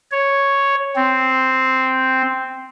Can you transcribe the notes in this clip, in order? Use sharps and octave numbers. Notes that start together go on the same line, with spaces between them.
C#5
C4